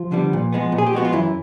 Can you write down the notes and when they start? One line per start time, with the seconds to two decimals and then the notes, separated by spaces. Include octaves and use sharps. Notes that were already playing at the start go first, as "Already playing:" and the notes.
Already playing: F3 F4
0.12 D3 G3 B3
0.33 A#2
0.52 F3 G#3 B3
0.72 A#2
0.78 G#4
0.86 G4
0.93 F3 G#3 B3 F#4
1.05 F4
1.12 F#2 E3 E4